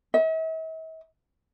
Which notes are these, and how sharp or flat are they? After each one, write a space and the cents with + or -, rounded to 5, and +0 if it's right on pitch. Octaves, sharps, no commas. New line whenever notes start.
E5 -45